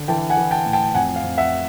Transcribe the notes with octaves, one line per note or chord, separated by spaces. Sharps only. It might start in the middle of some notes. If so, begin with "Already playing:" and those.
Already playing: D3
E3 G5 A5
F#5 G#5
E3
G5 A5
A2
G5 A5
F2 F#5 G#5
F5
F2
E5 F#5